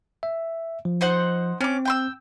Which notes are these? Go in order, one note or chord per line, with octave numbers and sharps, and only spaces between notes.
E5
F3
D#4 C5 F#5
C4 C#4 D6
G5 C6 E6